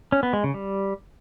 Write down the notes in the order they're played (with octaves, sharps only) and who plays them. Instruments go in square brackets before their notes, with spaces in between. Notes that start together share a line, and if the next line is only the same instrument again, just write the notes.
[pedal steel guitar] C#4
B3
G#3
C#3
G3